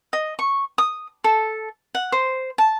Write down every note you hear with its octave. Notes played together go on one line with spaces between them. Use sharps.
D#5
C#6
D#6
A4
F#5
C5
A5